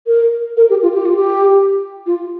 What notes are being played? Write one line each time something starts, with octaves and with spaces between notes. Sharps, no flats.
A#4
A#4
G4
F4
G4
F4
G4
F4